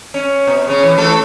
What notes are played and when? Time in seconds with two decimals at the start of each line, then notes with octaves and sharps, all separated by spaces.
0.14 C#4
0.47 B2
0.67 C#3 C#4
0.83 E3
0.97 E3 A3 A4